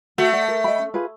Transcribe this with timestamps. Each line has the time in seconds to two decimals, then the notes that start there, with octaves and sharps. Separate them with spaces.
0.18 A3 F#4
0.33 A4 D5 F#5
0.48 A#4
0.64 D#5 G5 B5
0.79 C#4
0.94 F4 G#4 B4